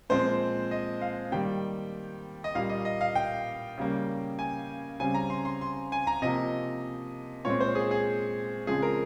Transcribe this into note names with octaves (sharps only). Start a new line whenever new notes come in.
A#2 F3 G#3 C4 C5
D#5
F5
D#3 G3 A#3 G5
D#5
A#2 G3 A#3 F5
D#5
D#5
F5
G5
C#3 G3 A#3
G#5
C#3 G3 C4 G#5
A#5
C6
C6
C6
G#5
A#5
C3 F3 A#3 D#5
A#2 G#3 C4 C#5
C5
G#4
G#4
C#3 F3 G#3 C4 G#4
A#4